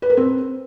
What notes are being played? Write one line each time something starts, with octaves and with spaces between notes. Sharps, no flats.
B4
A#4
C4